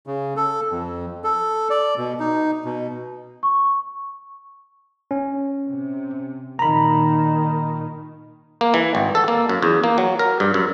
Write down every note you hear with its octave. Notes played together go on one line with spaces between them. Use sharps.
C#3
A4
F2
A4
D5
B2
D#4
B2
C#6
C#4
C3
A#2 D#3 A#5 B5
A#3
E3
G#1
A4
A#3
F#2
E2
A#3
F#3
A#4
G2
F#2